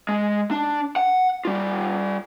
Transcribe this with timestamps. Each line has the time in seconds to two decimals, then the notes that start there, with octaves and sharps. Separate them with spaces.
0.09 G#3
0.51 D4
0.96 F#5
1.45 G3 F4